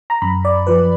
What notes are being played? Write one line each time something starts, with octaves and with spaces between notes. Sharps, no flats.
A#5
F#2 B5
D5
F3 B4